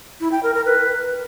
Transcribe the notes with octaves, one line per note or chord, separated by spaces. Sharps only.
E4
G5
A#4
A#4
B4